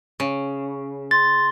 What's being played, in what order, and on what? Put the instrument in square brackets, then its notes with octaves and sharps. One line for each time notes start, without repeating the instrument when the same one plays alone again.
[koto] C#3
[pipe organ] C6 [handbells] A6